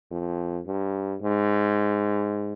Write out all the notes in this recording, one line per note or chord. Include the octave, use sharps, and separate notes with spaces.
F2
G2
G#2